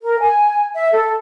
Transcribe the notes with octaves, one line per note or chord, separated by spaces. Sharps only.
A#4
G#5
E5
A4